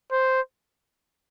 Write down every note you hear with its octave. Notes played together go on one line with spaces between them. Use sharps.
C5